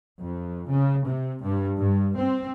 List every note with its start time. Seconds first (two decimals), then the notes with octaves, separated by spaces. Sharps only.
0.22 F2
0.71 C#3
1.07 C3
1.44 G2
1.79 G2
2.18 C4